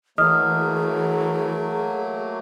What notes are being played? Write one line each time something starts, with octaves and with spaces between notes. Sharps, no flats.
E3 F#3 A3 A#3 G#4 D#5 D#6 F6